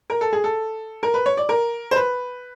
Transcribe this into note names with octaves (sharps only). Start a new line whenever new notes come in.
A#4
A4
G#4
A4
A#4
B4
C#5
D5
A#4
C5
B4